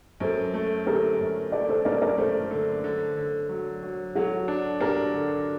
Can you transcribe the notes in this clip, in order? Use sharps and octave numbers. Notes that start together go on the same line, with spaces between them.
F#2 A4 C5
A3
D3 G4 A#4
F#2
A3 A#4 D5
A4 C5
F#2 A#4 D5
A#4 D5
A3 A4 C5
D3
D3
D3
F#3
F#3
F#3 F#4 A4
D4
D4 G4 A#4
D3